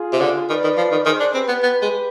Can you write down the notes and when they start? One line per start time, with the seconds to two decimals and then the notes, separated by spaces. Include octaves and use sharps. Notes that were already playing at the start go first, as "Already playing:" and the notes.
Already playing: F4 G#4
0.13 C3
0.21 D3
0.49 D#3 B4 D5
0.64 D#3
0.77 F3
0.92 D#3
1.06 D#3 G#4 C5
1.20 D4
1.34 C4 G4 B4
1.48 B3
1.63 B3
1.82 G#3